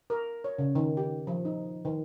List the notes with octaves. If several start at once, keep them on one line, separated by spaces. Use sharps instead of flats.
A#4
C#5
C#3
D#3
G4
F3
D#4
D#3